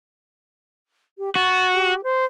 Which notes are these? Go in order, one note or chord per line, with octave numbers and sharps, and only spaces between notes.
G4
F#4 A6
G4
C5